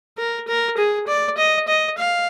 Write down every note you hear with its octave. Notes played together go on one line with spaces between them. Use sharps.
A#4
A#4
G#4
D5
D#5
D#5
F5